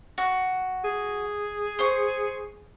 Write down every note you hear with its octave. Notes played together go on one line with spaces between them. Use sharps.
F#4
G#4
C5 C#6